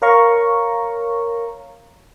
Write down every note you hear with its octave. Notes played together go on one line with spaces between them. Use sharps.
A#4 C#5 F5 A#5 C#6